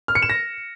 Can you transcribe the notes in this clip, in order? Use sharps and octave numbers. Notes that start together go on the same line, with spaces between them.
F6
C#7
E7
A#6